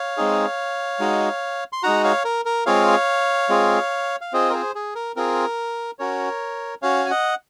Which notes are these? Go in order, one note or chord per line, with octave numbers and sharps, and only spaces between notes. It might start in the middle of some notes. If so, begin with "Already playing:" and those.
Already playing: C#5 F5
G#3 C4 D#4 G#4
G#3 D#4 F#4
C6
G#3 D#4 F#4 F#5 A#5
C#5 F5
A#4
A#4
G#3 C4 F4 G#4 C#5 F5
G#3 C4 F4 G#4
F5
C4 F4 G#4 C5 D#5
A#4
G#4 C5
G#4
A#4
C4 F4 G#4 A#4
C#4 F#4 A#4 C#5
C#4 F#4 C#5 F5
G#5
D#5 F#5